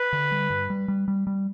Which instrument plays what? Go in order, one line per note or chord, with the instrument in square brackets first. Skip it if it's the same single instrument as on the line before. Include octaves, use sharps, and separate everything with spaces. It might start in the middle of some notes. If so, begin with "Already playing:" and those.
Already playing: [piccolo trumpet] B4
[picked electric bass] D3
G3
G2
G3
G3
G3
G3